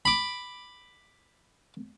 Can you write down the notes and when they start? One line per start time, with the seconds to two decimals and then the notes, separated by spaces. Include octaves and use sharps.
0.05 B5 D6